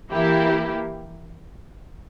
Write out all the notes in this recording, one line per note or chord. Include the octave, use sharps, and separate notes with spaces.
E3 A#3 E4 G4